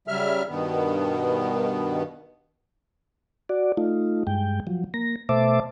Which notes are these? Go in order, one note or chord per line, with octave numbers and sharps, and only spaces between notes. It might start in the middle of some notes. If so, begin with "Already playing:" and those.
C#3 F#3 G3 E5 F6
G2 B2 D#3 B3
F#4 D5
A3 D#4 F4
G2 G#3 G5
F3 F#3
A#3 A#6
B2 A3 C5 E5 A5 D6